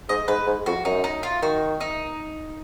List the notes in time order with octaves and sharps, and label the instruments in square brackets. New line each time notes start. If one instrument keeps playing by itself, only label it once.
[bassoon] G#2 [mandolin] D#5
[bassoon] G#2 [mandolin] B4
[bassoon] G#2
[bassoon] F2 [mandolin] F#4
[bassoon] F#2 [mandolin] D#4
[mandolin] D#4
F4
[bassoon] D#3 [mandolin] F#4
[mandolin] D#4